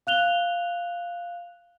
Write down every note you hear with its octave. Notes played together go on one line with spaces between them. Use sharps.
F5 F#6 F7 G7